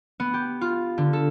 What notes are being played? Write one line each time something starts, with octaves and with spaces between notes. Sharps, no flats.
B3
G4
F4
D3
A4